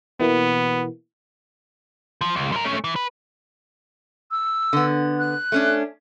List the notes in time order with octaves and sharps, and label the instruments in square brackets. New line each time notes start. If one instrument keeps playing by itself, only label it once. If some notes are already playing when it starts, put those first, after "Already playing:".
[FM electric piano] B2 E3 A#3 [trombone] B3
[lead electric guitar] F3
C#2
F#2 A#4
A3 C#4
E3
B4
[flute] E6
[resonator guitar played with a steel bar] D3 B3
[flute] F#6
[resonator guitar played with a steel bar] A3 C#4 D4